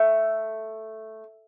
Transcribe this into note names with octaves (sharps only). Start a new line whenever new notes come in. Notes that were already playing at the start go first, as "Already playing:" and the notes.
Already playing: A3